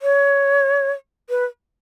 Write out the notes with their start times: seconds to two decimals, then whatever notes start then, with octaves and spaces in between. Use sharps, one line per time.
0.02 C#5
1.30 B4